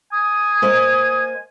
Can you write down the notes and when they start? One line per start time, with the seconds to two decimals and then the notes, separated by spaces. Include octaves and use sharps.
0.12 G#5 D#6
0.62 A#3 C5 D#5